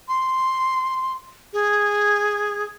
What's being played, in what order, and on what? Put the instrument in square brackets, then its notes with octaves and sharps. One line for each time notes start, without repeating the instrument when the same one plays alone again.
[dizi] C6
G#4